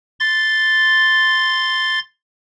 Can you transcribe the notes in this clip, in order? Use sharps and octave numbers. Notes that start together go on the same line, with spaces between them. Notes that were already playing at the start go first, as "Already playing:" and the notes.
C6 A6